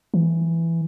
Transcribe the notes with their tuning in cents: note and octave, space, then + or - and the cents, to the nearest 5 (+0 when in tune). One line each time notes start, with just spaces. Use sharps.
E3 +10